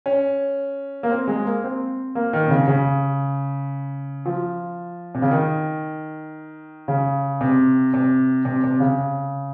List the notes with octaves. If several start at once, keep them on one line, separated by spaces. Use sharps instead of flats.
C#4
A#3
C4
G#3
A#3
C4
A#3
D#3
C3
C#3
C#3
F3
C3
C#3
D#3
C#3
C3
C3
C3
C3
C#3